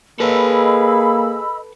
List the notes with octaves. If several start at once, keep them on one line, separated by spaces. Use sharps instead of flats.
A#3 G#4 A4 B4 D#5 B5 E6